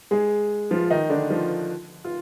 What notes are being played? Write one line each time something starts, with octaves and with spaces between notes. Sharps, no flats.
G#3 G#4
F3 F4
D#3 D#4
D3 D4
F3 F4
F4